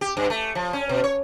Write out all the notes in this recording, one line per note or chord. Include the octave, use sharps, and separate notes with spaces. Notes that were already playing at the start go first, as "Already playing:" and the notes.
G4
G2
A3
F3
C#4
B2
C#5